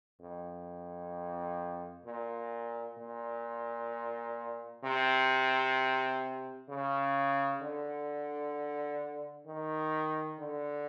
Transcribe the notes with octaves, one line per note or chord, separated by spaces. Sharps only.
F2
A#2
A#2
C3
C#3
D3
D#3
D3